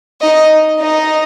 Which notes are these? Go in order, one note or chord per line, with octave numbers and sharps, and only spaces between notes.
D#4 D#5
D#4 D#5